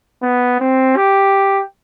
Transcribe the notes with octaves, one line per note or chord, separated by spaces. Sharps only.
B3
C4
G4